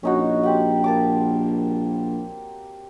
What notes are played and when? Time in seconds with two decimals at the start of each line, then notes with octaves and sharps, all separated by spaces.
0.03 A#1 C#4 D#4 F#4
0.43 C4 G4 F#5
0.84 A#3 A5 D6